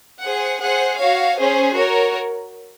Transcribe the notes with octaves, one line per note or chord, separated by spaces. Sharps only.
G#4 C5 F#5
G#4 C5 F#5
F#4 C#5 F5
C#4 G#4 C5
F#4 A#4 C#5